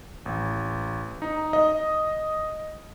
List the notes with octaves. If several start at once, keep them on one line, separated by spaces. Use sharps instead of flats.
A1
D#4
D#5